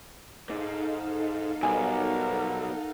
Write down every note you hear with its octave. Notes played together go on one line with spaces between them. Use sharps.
G#2 D#4 A4 F5
B1 G3 A#4 F#5 G#5